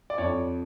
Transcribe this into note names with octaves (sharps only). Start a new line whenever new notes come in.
D5
F2 C#5